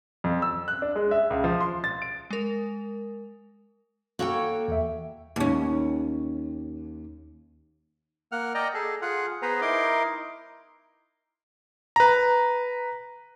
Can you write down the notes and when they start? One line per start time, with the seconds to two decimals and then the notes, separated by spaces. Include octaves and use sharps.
0.24 F2
0.42 E6
0.68 F#6
0.82 D4
0.95 G#3
1.11 E5
1.30 C#2
1.44 F3
1.61 C6
1.84 A6
2.02 D7
2.30 G#3 A#4
4.19 A#3 F#4 A4 C#5 G5
4.68 E2 E5
5.36 D#2 C#4
8.32 A#3 F#5 F6
8.55 D5 D#5 G5 A#5
8.74 G#4 A4
9.02 F4 G#4 F#5
9.42 B3 G#4 B4 C5 A#5
9.61 D#4 E4 A#4 C6 D6
11.96 B4 A#5